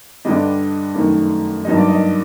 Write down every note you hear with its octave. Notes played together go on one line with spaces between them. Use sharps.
G2 D3 G3 D4 D#5
F#2 D#3 A3
G2 F#3 A#3 D#4 D#5
D5
D#5